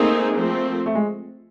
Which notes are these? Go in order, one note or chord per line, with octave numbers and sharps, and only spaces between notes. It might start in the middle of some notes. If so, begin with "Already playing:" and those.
Already playing: A3 A#3 C4 D#4 G#4
F3 A3 C4
A3
G#3